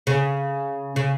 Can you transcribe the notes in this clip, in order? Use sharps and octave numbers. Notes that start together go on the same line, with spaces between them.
C#3
C#3